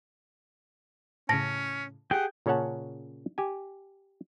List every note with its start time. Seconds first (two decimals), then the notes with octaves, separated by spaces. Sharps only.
1.29 A2 C#3 C#4 A5 A#6
2.11 G4 G#4 F#5 G5
2.46 A#2 C#3 C#4 C#5 F#5 A5
3.38 G4 G#5